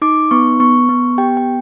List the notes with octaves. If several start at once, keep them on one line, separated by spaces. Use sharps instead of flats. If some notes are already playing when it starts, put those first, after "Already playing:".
D#4 D6
B3 C#6
B3 C#6
B3
G4 G5
G5